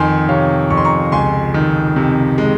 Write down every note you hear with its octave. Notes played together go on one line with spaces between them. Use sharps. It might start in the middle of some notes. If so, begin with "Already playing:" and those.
Already playing: F2 D#3 G#5 C6
C3 C#5 F5
F2 C#6
C6
A#5 C#6
C#2 G#5 C6
D#3
C3
G#3